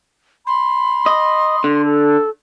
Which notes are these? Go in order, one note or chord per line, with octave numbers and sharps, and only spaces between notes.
B5 C6
D#5
D3
A4